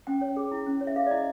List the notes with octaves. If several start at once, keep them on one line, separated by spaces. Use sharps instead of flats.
C#4 G5
C#5
G#4
E4
C#4
C#5
E5
G#4 F5
D5
E4 D#5